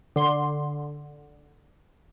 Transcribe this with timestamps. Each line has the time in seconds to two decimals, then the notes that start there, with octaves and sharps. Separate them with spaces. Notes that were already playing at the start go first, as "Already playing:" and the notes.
0.16 D3 C6